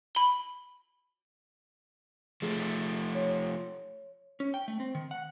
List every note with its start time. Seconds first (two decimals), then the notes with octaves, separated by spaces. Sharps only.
0.15 B5 G7
2.42 F3 A3 G#4
3.15 C#5
4.40 C#4
4.54 G5
4.68 A3
4.80 C4
4.95 D#3
5.11 F#5